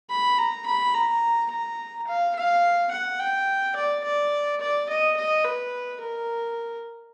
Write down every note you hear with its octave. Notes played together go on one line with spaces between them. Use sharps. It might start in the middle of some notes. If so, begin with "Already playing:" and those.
B5
A#5
B5
A#5
A#5
F5
F5
F#5
G5
D5
D5
D5
D#5
D#5
B4
A#4